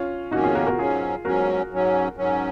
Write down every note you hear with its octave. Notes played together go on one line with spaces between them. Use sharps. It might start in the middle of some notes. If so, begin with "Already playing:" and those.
Already playing: C#4 F4
F2 D#3 A#3 C#4 D#4 F#4
F4 G#4
F#4 A#4
F#4 A#4
G#2 F#3 C#4 F4 G#4
G#2 F#3 C#4 F#4 A#4
G#2 F#3 C#4
G#2 F#3 C#4